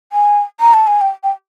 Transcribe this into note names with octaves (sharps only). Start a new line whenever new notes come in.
G#5
A#5
A5
G#5
G5
G5